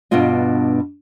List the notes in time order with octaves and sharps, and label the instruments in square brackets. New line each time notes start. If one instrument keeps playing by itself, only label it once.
[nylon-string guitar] G2 B2 B3 D4 F4 D#5